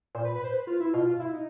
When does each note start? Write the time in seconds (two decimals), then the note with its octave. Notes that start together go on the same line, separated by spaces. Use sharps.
0.15 A#2 C5
0.25 B4
0.35 B4
0.44 C5
0.54 B4
0.67 F4
0.80 E4
0.93 B2 F4
1.06 F4
1.20 E4
1.33 D#4